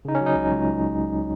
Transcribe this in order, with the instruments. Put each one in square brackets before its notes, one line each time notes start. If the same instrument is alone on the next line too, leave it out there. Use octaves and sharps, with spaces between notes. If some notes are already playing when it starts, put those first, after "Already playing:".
[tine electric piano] C#3 D#4
C#4
F#3
D#4
C#2
C#2